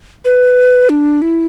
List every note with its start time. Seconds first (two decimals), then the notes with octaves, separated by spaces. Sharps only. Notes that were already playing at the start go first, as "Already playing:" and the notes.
0.25 B4
0.89 D4
1.22 E4